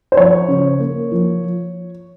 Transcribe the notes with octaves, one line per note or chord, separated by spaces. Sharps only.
C5
F3 C#5
C#3
A#3
F3